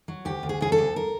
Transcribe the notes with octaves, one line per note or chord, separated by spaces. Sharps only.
F#3
D2 G4
D2
G#4
C#3 G#4
A4
D2
A#4